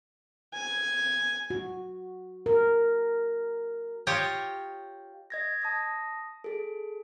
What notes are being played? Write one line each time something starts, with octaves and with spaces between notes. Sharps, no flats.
G#5
F#4
A#4
F4 G4 C#5 D#5
D#5 G#6 A#6
A5 D#6 A#6
G#4 A4